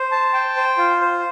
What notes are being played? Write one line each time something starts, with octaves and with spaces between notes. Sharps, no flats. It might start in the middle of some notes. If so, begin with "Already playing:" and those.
Already playing: C5
A5
G5
C5
F4
C5